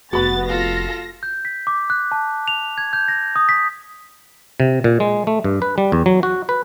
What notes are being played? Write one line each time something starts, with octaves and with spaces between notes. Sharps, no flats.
F1 B3 F#4 B5 A6
F4 A4 F5 A#6
G6
B6
D6
F#6
A5
F7
G#6
G6
A#6
D#6
B6
C3
A#2
G#3
A3
G2
B4
G3
E2
F#3
F#4
B4